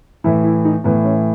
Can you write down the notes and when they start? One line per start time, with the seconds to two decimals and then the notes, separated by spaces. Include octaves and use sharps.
0.24 A2 E3 E4
0.44 E4
0.65 D#4
0.84 A2 E3 B3
1.05 C#4